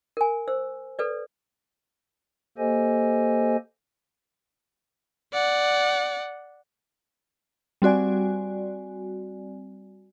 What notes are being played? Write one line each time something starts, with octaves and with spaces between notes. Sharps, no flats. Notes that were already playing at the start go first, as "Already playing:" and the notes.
A#4 G#5
C5 E6
A4 B4 D5
A#3 G4 A4 C5 D#5 G#5
D5 F#5
G3 C4 F#4 D5 G#5